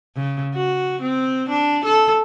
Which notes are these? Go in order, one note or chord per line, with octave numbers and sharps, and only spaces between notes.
C#3
F#4
C4
D4
A4